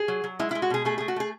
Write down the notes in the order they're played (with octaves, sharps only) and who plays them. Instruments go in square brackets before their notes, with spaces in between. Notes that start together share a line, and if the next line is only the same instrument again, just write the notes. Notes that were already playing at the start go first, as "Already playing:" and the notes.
Already playing: [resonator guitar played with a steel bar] G#4
F#3
F#3
G#3 E4
E4
G#3
F#4
B2 G#4
A3 G#4
A3 G#4
F#4
A3 G#4